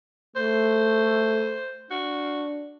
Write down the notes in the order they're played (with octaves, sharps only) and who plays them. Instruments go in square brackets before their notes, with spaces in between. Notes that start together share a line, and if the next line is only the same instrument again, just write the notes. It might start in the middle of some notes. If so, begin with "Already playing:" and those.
[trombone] A3 [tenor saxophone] C5
[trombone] D4 [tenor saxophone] F#4